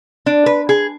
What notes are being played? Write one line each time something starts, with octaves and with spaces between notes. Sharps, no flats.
D4
B4
G#4